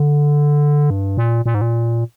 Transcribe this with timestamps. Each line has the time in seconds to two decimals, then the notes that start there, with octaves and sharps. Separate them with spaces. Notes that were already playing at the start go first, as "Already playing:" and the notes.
Already playing: D3
0.90 G2
1.17 A#2
1.46 A#2
1.54 G#2
1.61 A#2